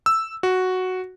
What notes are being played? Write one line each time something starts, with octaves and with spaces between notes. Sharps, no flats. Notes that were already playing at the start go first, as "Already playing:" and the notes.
E6
F#4